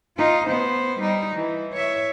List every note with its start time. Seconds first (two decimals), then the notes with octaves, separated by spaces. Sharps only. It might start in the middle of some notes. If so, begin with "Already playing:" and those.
0.17 D#4 F4
0.47 B3 C5
0.99 G3 D#4
1.36 E3
1.73 C#5 E5